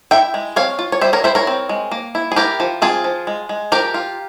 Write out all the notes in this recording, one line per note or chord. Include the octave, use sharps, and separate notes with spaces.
E4 E5 G5
G#3
C4 C#5 F5
F4
C#5
G3 C5 E5
A#4 C#5
E4 C5 E5
A#4 C#5
C4
G#3
A#3
E4
G#4
E4 G4 A#4
F3
C4 F4 G#4
F3
G#3
G#3
F3 G4 A#4
F4